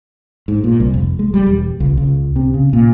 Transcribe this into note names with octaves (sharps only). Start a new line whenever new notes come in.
G#2
A#2
C2
F1
G#3
G3
E1
C#2
C#2
C3
C#3
A#2